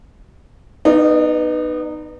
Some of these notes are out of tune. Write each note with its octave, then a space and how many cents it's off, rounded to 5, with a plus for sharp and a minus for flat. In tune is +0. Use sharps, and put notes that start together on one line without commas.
B3 +0 D#4 -20 D5 +35